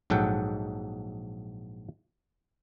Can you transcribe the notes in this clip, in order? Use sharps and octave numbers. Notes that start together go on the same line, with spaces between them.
A#1 G#2 F#3 A4 F#5 G5